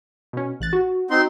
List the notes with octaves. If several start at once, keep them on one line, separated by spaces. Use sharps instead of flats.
B2 C#4
A1 F#6 A6
F#4
C4 D#4 C6